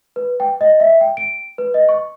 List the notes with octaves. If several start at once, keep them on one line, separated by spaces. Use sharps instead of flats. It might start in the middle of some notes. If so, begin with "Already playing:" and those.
B4
G5
D#5
E5
G5
D7
B4
D#5
C#6